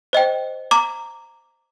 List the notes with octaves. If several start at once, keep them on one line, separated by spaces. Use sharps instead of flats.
C5 D#5 G5
A#5 D6